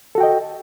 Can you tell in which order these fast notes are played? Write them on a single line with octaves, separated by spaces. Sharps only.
A4 F#4 G5 D#5